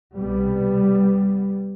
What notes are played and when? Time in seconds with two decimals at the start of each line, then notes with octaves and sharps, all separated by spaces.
0.17 C2 B2 G3 B3